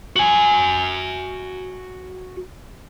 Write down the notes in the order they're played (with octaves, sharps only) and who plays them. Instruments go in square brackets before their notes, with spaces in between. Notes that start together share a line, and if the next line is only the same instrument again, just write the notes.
[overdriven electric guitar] F#4 G#5